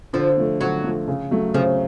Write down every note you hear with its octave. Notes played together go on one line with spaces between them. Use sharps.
D3 F3
F3 A3
D3 F#3
F3 A3
C#3
F#3 A3
C#3 F3